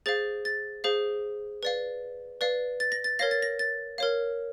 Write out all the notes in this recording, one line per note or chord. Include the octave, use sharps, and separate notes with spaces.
G#4 C5 F5 A6
A6
G#4 C5 F5
B4 D5 F5
B4 D5 F5
A6
A#6
A6
A#4 C#5 F5 A#6
A6
A#6
A6
A#4 C#5 F5